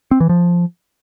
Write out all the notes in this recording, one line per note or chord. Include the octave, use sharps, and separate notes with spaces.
C4
E3
F3